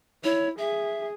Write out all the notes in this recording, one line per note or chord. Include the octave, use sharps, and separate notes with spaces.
E4 C#5
G#4 E5